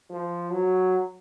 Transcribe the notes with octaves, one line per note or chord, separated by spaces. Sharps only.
F3
F#3